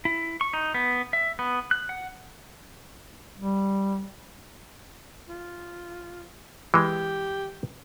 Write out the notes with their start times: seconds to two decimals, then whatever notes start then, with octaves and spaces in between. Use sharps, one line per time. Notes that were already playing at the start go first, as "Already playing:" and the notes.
0.05 E4
0.41 C#6
0.53 D#4
0.74 B3
1.13 E5
1.39 B3
1.71 F#6
1.89 F#5
3.39 G3
5.28 F4
6.74 E3 G#3 G4